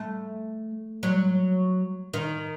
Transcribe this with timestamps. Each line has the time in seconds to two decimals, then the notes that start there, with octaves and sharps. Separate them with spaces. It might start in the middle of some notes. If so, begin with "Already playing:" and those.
Already playing: A3
1.03 F#3
2.14 D#3